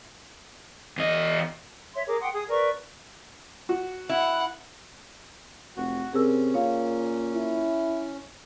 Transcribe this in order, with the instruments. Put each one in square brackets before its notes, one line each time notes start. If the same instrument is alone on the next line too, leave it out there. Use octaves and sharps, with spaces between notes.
[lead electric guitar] E2 D#5
[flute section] C#5 E5 C6
G#4 A#4 D6
F#5 G5 C6 D#6
G#4 D#6
A#4 B4 D5 C#6
[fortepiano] F#4
[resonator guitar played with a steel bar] E4 [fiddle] F#5
[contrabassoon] F1 [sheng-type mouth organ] F#4
[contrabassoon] C3 [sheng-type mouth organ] C#4 [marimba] G#4 A#4 E6
[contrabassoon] A#2 [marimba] C#5 F5
[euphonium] E4